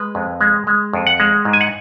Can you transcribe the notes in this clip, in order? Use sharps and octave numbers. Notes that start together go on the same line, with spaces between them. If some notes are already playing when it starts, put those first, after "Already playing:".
Already playing: G#3 B4
F2
G#3
G#3
F2
F#5
G#3
G#2
G#5
F#5